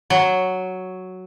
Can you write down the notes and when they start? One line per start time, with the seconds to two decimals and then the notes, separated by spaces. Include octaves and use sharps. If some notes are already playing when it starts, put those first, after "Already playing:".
0.10 F#3